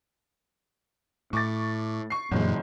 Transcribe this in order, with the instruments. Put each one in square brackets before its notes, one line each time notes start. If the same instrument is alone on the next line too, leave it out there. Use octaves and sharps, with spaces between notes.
[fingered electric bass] A2 [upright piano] C#6 D6 A6
[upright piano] C#6 C7
[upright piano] G1 G#3 [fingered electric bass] F#2 A#2 E3